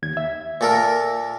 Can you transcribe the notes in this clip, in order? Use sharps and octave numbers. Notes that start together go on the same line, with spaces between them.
D#2 G#6
E5
A#2 A4 A#4